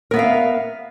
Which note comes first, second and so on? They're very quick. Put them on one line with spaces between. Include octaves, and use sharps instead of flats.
A#4 B3 E5 F5